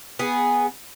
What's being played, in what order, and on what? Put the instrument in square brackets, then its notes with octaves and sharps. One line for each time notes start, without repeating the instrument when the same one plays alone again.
[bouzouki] B3 G#4